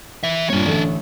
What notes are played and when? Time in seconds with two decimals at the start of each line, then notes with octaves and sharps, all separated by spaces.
0.24 E3 E5
0.50 G2 A#2 D4 C#5
0.66 A1 D3 A3